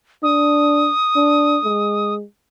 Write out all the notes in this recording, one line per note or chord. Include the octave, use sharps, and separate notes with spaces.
D4 D#6
D4
G#3